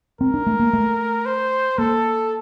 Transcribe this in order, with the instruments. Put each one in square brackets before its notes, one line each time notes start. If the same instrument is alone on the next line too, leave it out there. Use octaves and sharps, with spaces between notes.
[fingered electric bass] C4 [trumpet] A#4
[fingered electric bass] D4
A3
A#3
A3
[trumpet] C5
[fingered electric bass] A#3 [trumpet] A4